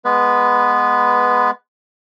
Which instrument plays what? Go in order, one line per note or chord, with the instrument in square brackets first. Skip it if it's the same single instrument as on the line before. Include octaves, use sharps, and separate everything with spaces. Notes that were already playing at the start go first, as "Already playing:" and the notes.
[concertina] G#3 B3 B4